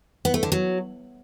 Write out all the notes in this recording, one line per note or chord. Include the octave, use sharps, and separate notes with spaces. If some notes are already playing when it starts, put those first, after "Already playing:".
B3
A3
D3
F#3